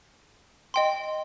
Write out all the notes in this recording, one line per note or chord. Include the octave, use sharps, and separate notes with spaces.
D#5 G5 C6